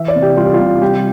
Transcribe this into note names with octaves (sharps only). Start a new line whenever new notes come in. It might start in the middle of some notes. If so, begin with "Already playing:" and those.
Already playing: E3 E5
D5
C3
G4
G3 F4
G4
F4
C3
G3 G4